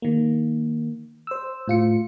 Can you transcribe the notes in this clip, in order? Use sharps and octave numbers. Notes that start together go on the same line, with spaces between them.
D#3 A#3
C5 E6
A2 F4 C#7